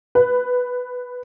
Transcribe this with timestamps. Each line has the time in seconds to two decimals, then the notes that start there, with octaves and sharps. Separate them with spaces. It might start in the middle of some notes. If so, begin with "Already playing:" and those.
0.15 B4